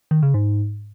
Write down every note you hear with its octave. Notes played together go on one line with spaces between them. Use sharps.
D#3
C#3
G#2